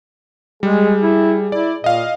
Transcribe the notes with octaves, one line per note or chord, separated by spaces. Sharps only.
G3 G#3 G#4
E4
E4 D5
A#2 D#5 F5